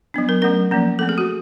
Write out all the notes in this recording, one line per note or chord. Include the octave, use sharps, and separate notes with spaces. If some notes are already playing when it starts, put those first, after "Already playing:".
F#3 B3 D4
A#4
F#3 A3 C#4 A#4
F3 A#3 C#4
F3 A3 C4 A4
G#4
F#4